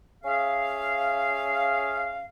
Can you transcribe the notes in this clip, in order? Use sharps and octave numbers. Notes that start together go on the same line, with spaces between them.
C#4 G#4 E5 F5